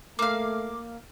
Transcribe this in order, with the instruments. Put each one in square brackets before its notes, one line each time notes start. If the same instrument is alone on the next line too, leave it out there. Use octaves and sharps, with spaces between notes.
[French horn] A3 [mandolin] A#3 F5 [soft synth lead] D6